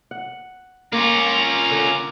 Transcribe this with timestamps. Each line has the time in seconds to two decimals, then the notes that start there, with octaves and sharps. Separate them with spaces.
0.11 F#5
0.93 A#3 C#4 F4 A#5 D6
1.71 D3